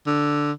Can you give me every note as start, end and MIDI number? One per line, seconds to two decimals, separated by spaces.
0.07 0.52 50